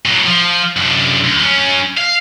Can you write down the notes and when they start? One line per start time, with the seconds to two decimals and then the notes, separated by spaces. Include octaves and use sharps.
0.06 A2 F#3
0.26 F3
0.77 F#2 D3
1.24 D2
1.39 F#3 C#4
1.97 F5